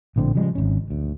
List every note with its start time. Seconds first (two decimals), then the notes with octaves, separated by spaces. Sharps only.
0.16 A#1 A2 D3 C4
0.35 C#3 F3 G3 G#3
0.55 G#1 C#4
0.91 D2